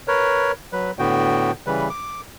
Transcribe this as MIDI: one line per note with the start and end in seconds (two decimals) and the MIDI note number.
0.08 0.52 70
0.08 0.52 71
0.08 0.52 73
0.73 0.91 54
0.73 0.91 71
0.99 1.51 45
0.99 1.51 50
0.99 1.51 59
0.99 1.51 66
0.99 1.51 79
1.67 1.89 49
1.67 1.89 52
1.67 1.89 55
1.67 1.89 71
1.89 2.21 86